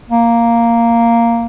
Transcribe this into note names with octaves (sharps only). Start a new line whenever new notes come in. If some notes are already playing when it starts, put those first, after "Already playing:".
A#3